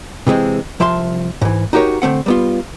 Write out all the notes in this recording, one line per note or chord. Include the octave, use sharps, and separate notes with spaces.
C3 E3 G#3 C4
C2 F3 E5 A5 C6
G#2 E3
D#4 F#4 G4 A#4 C#5
D3 A3 C4 F#5
G3 B3 F4